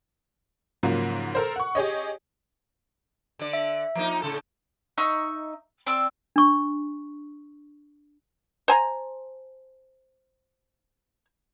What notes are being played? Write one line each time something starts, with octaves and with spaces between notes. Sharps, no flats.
G#2 C#3 F3 F#3 A#3
A4 A#4 C5
F#5 C#6
G4 G#4 C#5 D#5
D3 D5
E5
F3 A#3 D#4
A2 C#3 A4
D#4 E5 C#6
C4 D5 E6
D4 C#6
C5 G#5 A#5